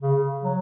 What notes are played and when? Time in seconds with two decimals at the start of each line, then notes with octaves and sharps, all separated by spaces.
0.02 C#3
0.44 F#3